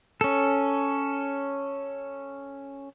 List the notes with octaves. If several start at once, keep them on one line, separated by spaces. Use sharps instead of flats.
C#4 A4